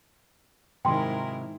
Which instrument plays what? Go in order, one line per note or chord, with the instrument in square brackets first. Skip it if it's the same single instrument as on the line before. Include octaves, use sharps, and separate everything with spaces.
[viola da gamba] G#2 E4 A#4 [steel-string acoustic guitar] C3 D#3 F#3 [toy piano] G5 C6